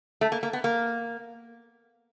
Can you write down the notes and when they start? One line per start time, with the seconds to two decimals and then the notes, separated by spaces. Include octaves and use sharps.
0.21 A3
0.32 A#3
0.43 A#3
0.53 B3
0.64 A#3